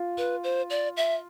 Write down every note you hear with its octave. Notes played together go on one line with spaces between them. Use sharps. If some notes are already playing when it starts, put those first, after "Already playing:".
Already playing: F4
B4
C5
D5
E5